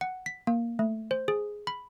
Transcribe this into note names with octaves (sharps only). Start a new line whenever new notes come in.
F#5
B6
A#3
A3
C5
G#4
B5